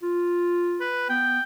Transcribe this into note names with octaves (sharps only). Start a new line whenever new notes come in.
F4
B4
B3 G5